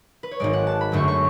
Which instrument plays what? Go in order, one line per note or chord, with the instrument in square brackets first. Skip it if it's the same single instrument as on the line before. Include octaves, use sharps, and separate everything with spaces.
[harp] B4
C#5
G#1 G#2 G#3 D5
F#5
A5
B5
F#2 D3 F#3 A3 C#6
C#6